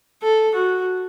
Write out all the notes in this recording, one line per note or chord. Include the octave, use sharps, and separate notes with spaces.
A4
F#4